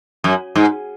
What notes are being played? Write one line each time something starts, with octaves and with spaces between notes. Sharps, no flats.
F#2
G#2